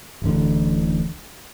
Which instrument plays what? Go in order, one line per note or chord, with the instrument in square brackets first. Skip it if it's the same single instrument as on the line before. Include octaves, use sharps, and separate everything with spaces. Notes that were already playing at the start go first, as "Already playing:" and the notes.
[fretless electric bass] D1 A1 D3